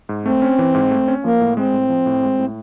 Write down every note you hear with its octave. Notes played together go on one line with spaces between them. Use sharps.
G#2
A3 C4
C#4
E3
G#2
A3
C#4
F3 A#3
A2
G#3 C4
A2
F3
A2
G#3
A2